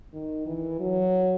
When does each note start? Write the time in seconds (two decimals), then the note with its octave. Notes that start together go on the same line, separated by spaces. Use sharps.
0.13 D#3
0.47 E3
0.80 F#3